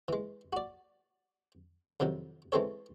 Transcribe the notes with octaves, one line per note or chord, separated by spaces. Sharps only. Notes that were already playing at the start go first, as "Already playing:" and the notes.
E3 G#3
F#4 D5
F2 C3 D#3 F#3
E3 G#3 A3 C4 A4 C#5